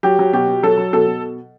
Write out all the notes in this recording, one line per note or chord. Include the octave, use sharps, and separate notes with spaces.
F#3 G4
F#3
B2 G4
B2
F#3 A4
F#3
B2 A4
B2